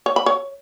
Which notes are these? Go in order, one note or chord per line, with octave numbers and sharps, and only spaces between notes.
C#5
B5
C#5